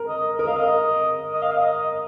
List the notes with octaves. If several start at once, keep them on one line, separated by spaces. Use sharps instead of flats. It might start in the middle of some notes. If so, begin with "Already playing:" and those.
Already playing: A#4
D#5
A#4 D#5
F5
D#5
D#5
F5
D#5
D#5